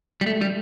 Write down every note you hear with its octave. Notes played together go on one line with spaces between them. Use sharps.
G3
A3
G3